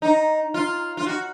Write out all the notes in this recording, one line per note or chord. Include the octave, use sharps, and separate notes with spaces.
D#4
F4
F4
F#4